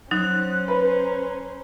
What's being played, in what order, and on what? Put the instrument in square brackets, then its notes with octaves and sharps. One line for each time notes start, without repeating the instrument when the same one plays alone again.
[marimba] F#3 D#4 [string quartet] C#4 C5 [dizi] F#6
[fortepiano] B4 [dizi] A#5